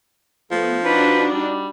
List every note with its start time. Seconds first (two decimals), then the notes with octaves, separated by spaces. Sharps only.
0.52 F3 A3 B3
0.85 D4 D#4 F#4 B4
1.31 G3